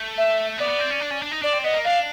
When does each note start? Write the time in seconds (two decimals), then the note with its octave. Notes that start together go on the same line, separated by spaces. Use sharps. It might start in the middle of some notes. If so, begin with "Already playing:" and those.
Already playing: A3
0.17 E5
0.59 B3 D5
0.69 B3
0.80 C4
0.91 C#4
1.01 D4
1.11 C#4
1.22 D4
1.32 D#4
1.42 D4 D5
1.53 C4
1.64 B3 D#5
1.74 A#3
1.84 D4 F5